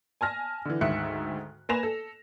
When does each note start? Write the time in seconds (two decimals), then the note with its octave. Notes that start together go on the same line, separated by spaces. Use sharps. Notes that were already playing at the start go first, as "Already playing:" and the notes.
0.21 G#5 A5 F6 A#6
0.65 D3 E3
0.81 D2 G#2 D#3 E5 F#6 C#7
1.69 A#3 B4 G#5 A#6 E7 F7
1.83 A4